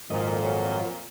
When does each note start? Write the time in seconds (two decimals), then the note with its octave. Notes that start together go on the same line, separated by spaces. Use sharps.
0.10 G#1 F2 A#2 D#5
0.45 F#3